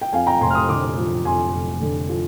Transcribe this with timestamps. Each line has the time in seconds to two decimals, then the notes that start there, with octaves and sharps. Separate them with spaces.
0.01 G5
0.12 F2 F5 G#5
0.27 G5 A#5
0.40 F1 G#5 C6
0.50 F6
0.55 C6 D#6
0.69 D3 D6 F6
0.97 F3
1.25 F2 G#5 C6
1.53 F1
1.81 D3
2.09 F3